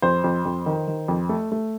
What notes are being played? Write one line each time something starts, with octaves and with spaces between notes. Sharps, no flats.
F2 C5
F2
F2
D#3
D#3
F2
A3
A3